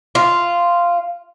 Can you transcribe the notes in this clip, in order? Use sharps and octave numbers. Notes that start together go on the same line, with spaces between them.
F4